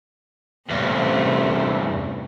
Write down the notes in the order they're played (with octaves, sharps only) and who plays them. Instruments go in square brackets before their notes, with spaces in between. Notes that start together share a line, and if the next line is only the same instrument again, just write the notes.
[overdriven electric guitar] E2 G2 [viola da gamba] C3 A3 C#4